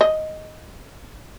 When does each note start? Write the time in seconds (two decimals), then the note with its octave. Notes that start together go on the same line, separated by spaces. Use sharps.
0.01 D#5